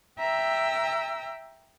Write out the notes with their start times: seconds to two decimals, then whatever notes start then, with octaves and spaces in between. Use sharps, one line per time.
0.18 E5 G5 A#5 E6